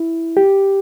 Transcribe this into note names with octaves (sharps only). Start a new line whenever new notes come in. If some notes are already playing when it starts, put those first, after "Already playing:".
Already playing: E4
G4